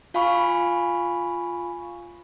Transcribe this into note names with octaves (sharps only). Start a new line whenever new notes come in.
F4 F5 G#5 B5 C#6